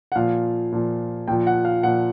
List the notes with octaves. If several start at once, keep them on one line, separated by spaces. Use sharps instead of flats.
F#5
A#2 F3 F5
A#2 F3
A#2 F3 G5
F#5
F5
A#2 F3 F#5